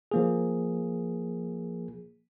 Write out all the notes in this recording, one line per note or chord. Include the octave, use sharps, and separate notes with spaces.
F3 A#3 G#4